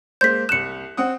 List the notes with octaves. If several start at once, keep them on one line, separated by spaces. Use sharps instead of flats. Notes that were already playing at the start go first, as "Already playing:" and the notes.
G#3 A#3 C5 G6 B6
C2 F#6 C#7 E7
C4 F#5 D#6